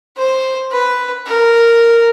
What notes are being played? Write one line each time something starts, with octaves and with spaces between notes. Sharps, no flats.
C5
B4
A#4